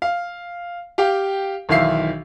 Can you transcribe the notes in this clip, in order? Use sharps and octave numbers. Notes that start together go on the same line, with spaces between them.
F5
G4 F5 G5
B1 D#3 E3 E5 F5 C7